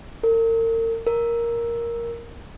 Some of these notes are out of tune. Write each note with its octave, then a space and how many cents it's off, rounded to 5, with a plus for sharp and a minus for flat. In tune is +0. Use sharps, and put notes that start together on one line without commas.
A#4 -40
A#4 +5